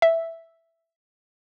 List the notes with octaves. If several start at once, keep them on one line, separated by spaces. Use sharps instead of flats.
E5